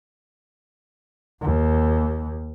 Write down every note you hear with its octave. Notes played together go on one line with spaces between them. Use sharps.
D#2